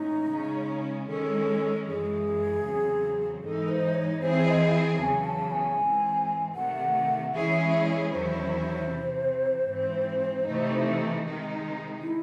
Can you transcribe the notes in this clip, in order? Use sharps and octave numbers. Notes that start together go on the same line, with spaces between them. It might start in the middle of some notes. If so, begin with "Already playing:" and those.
Already playing: A2 E3 G#3 C#4 D#4
C#3 G#3 C#4
D#3 G#3 C#4 A4
F#2 E3 G#3 G#4
E2 C#3 F#3 C4
G#2 E3 G#3 D#4 A4
C5
C#5
E3 C4 E4 G#4 C5
E5
D#5
E2 C#3 F#3 G#5 A5
A5
G#5
G#2 E3 G#3 C4
C3 D#3 A3 F#5
E3 G#3 C#4 E4 G#4 E5
E5
C#5
E2 D#3 F#3 C#4 E4 C5
C3 E3 C4
G#2 E3 C4
C3 E3 A3 D#4
C3 D#3 G#3 D#4
E4